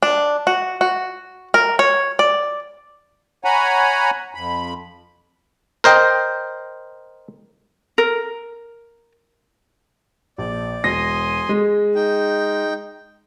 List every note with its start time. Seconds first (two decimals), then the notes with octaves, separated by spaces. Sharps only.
0.02 D4
0.47 F#4
0.81 F#4
1.54 A#4
1.79 C#5
2.19 D5
3.44 C#5 F#5 G#5 A#5 B5
4.34 F2 B5
5.84 A#4 C5 D#5 G5
7.98 A#4
10.38 A#1 D5
10.84 E1 G#5 C6 D#6 A#6
11.49 G#3
11.95 D#4 G5